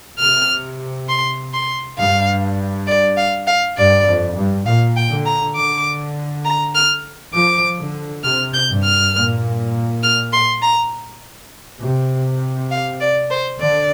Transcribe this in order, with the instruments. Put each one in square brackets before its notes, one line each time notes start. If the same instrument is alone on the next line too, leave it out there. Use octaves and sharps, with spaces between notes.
[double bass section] C3 [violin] F6
[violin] C6
C6
[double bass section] G2 [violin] F5
[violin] D5
F5
F5
[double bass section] G2 [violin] D5
[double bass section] F2
G2
[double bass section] A#2 [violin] F5
[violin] G5
[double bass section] D3
[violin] A#5
[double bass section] D3 [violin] D6
[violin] A#5
F6
[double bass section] F3 [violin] D6
[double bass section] D3
[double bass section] C3 [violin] F6
[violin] G6
[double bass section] G2
[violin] F6
[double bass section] A#2
[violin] F6
C6
A#5
[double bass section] C3
[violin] F5
D5
C5
[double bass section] D3 [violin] D5